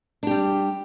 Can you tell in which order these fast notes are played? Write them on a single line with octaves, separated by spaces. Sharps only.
D4 G4 G3